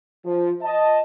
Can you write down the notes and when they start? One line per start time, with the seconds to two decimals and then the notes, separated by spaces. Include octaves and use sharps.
0.25 F3
0.62 D#5 A5